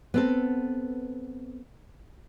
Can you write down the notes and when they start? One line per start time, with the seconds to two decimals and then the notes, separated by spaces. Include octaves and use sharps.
0.14 B3 C4 A4